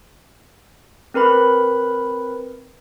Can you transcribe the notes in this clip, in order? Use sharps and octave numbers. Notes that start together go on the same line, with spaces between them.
C4 A#4 B4 B5